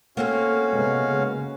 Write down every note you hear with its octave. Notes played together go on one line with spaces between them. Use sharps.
A#3 C4 C#4 F#4 A4 F5
C3 G#3 B3
C#3